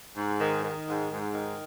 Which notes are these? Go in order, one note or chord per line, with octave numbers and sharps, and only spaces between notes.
G#2
D#3
D#3
G#2
G#2
D#3